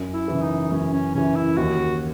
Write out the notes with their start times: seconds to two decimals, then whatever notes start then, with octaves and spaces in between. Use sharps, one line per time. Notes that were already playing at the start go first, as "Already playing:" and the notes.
Already playing: F#2
0.14 E4
0.28 C#3 E3
0.42 D#4
0.71 F#2 C#4
0.93 C#4
1.14 C#3 E3 C#4
1.35 E4
1.57 D#2 F#4